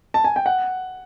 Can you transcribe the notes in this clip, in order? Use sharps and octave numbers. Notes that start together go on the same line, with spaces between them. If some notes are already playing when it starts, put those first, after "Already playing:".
A5
G#5
G5
F#5